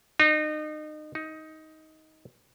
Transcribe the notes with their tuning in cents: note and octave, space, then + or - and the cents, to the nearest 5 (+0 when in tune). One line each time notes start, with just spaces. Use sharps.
D#4 -30
D#4 +15